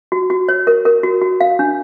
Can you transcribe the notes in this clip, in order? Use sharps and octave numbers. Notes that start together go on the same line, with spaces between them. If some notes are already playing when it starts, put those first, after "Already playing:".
F#4
F#4
C#5
A#4
A#4
F#4
F#4
F5
D4